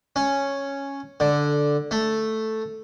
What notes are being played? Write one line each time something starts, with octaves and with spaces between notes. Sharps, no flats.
C#4
D3
A3